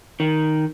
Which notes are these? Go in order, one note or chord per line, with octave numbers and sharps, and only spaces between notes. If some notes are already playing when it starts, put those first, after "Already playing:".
D#3